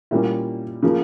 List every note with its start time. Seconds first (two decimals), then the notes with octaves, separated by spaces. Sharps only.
0.11 A#2 G3 A#3 C#4 E4
0.83 C#3 F3 A#3